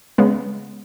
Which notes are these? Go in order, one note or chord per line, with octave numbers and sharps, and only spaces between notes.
C#3 G#3 B3